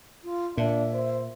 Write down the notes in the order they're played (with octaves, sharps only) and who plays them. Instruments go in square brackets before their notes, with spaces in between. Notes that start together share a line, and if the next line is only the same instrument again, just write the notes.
[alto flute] F4
[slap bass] A#2 [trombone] D4 [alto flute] E5
[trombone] C5